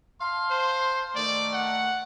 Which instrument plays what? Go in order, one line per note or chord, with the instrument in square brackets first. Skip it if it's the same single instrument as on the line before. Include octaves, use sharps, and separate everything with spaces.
[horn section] F5 A5 C6
[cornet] C5
[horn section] D#3 A3 [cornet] D5
[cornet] F#5